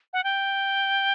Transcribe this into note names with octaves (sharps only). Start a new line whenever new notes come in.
F#5
G5